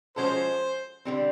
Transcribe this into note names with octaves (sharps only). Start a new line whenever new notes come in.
F3 G#3 C#4 F#4 A4 C5
D3 G3 C4